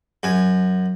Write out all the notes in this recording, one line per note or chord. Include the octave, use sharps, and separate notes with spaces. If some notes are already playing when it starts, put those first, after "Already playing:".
F#2 G#5